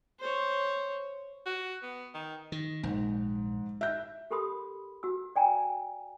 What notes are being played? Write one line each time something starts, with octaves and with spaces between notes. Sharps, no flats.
C5 C#5
F#4
B3
D#3
D#3
A#1 G#2
E5 G6
G4 A4 A#4 B5 C6 D#6
F#4 E6
D5 G5 G#5 A#5